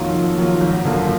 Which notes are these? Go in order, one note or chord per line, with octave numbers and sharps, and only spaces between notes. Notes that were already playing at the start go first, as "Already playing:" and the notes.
Already playing: F2 D#3 F#3 A#3 F4
F2
D#3 F#3 A#3 F4
G#1
F#2 D3 F3 A#3